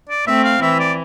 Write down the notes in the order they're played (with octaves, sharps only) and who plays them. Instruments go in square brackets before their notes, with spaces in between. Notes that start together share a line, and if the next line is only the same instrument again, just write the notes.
[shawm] D5
[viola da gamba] A3 C4 [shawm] E5
[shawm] F5
[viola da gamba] E3 [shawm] E5
[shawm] D5